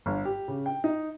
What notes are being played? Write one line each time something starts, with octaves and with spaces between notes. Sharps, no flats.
G1
G4
C#3
G5
D#4